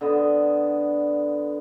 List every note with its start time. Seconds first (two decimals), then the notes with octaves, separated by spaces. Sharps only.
0.01 D3 B3 D#5